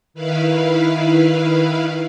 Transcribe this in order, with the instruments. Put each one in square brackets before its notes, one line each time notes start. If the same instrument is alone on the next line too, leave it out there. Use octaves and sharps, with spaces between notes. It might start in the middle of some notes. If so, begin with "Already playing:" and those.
[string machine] D#3 E4 B4 F5